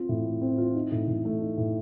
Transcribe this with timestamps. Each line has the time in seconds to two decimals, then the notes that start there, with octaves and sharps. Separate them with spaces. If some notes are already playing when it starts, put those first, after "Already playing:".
Already playing: C4 F4
0.09 A2
0.26 A3
0.41 C4
0.58 F4
0.75 D#4
0.92 A2
1.07 A2
1.25 A3
1.41 D#4
1.57 A2